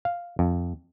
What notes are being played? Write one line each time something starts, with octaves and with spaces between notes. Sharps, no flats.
F5
F2